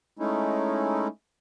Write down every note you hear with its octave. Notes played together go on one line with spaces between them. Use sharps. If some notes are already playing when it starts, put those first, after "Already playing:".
G#3 A3 C#4 D#4 E4